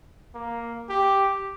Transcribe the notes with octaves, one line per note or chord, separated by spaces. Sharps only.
A#3
G4